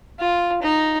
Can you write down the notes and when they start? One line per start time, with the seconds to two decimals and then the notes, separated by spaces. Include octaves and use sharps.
0.19 F4
0.62 D#4